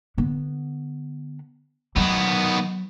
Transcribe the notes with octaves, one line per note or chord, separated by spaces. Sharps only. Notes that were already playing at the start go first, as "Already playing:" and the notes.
D3 B3
D#3 F#3 B3